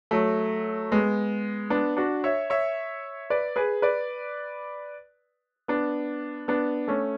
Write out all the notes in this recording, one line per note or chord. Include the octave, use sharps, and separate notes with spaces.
F#3 A3
G#3 B3
B3 D4
D4 F#4
C#5 E5
C#5 E5
B4 D5
G#4 B4
B4 D5
B3 D4
B3 D4
A3 C#4